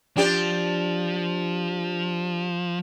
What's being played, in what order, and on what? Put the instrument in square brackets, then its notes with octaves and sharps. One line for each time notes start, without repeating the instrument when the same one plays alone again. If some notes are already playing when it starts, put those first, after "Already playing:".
[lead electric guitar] F3 [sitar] D4 G4 D5